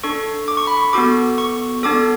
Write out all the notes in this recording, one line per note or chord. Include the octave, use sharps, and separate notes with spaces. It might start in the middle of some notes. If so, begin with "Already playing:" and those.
D4 A4 C#6
D6
C#6
B5
C#6
B3 F#4 A4 D6
C#6
B3 D4 A4 D6